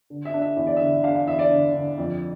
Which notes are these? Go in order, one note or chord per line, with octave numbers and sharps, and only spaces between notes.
D3
E5
D4
E5
E2 E5
D5
D3 E5
D4 F5
F5
E2 E5
D5
D3
D3
F2